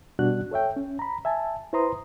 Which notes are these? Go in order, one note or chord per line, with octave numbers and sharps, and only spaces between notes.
B2 G3 D4 F#4 F#6
A4 C#5 E5 G5
C#4
A#5 B5
E5 G#5 A5
E4 B4 C5 A#5 C6 D#6